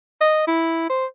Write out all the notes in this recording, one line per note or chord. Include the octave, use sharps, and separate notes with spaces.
D#5
E4
C5